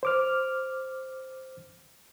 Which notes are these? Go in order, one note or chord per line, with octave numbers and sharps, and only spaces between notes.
C5 D6 F6